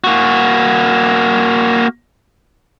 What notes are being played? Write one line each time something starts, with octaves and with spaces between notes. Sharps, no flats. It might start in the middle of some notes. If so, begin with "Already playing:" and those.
A#3 F#4